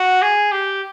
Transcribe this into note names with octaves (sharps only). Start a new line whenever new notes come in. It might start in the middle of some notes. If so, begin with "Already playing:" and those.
Already playing: F#4
G#4
G4